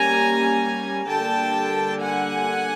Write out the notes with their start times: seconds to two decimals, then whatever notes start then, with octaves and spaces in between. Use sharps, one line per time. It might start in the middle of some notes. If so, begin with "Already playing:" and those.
Already playing: G3 A#3 C#4 G#5 A#5
1.09 D3 G3 A#3 D4 G5 A5
2.02 F#5 G#5